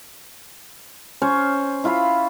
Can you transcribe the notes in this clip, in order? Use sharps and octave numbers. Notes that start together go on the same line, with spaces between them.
C#4 C5 C#5
E4 F4 F5 B5